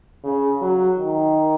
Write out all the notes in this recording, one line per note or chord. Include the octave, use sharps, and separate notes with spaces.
C#3
F#3
D#3